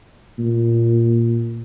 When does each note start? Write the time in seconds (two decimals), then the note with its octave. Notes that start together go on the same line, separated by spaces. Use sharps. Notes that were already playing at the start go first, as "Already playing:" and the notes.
0.39 A#2